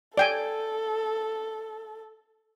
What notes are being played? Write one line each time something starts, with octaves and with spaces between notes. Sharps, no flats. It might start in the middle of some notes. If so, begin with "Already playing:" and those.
A4 D5 G5 G#5